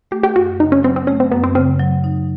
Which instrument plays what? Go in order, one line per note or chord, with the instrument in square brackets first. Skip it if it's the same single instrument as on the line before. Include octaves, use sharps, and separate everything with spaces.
[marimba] A3 [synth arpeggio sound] G4
[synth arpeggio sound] G4
[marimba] F#2 [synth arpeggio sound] F#4
[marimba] C#3 [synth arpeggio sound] D#4
[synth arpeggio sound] C#4
[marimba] F#3 [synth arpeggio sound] C4
[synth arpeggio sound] C4
[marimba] A3 [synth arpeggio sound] C#4
[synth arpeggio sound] C4
[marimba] F#2 [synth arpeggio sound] B3
[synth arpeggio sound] C4
[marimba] C#3 [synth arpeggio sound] C4
[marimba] F#3
D#4